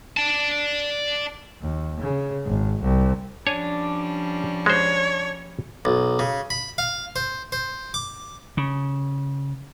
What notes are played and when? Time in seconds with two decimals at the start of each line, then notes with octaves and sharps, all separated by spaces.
0.17 D5 A5
1.61 D#2
2.00 C#3
2.45 G#1
2.82 C2
3.47 F3 G3 C#4 D4 C#5 G#5
4.66 G#3 F#4 C5 C#5
5.85 B1
6.19 C#3
6.50 B5
6.78 F5
7.16 C5
7.52 C5
7.94 D6
8.57 C#3